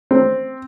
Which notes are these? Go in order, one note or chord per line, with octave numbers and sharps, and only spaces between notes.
C4